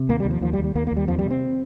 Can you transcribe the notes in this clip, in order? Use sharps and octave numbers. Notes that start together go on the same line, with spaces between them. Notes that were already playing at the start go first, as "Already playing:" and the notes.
Already playing: C3
D#2 A#3
G3
D#2
F3
D#2 F3
G3
D#2
G3
D#2 A#3
A#3
D#2
G3
F2 F3
G3
C3
C4